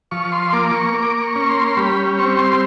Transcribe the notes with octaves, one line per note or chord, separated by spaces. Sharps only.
F3 C#6
C6
A#3 D6
C#6
A#3 D6
C#6
C#4
C6
G3 B5
C4 C#6
C6